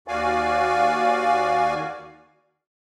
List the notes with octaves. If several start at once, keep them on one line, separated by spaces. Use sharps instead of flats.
D#2 F#4 D5 F5 G#5